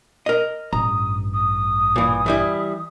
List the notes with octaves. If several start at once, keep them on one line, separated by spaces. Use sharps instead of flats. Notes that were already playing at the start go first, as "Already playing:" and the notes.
A#4 D#5
A1 G2 A#5 D#6
D#6
A#2 E3
E3 G3 E4